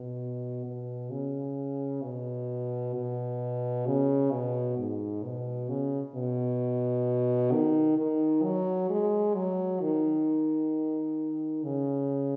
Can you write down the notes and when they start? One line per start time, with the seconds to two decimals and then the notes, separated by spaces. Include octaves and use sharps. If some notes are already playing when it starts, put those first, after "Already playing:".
Already playing: B2
0.66 B2
1.11 C#3
2.03 B2
2.94 B2
3.86 C#3
4.32 B2
4.77 G#2
5.23 B2
5.69 C#3
6.15 B2
7.53 D#3
7.98 D#3
8.43 F#3
8.89 G#3
9.35 F#3
9.81 D#3
11.64 C#3